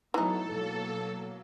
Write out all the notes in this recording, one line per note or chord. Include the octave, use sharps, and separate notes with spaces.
E3 F#3 A3 B3 D#4 A4
B2 F#3 A#3